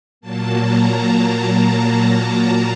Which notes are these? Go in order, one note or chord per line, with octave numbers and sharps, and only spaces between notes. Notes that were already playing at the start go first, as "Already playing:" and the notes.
A#2 F#3 A#3 A5
A#5
A5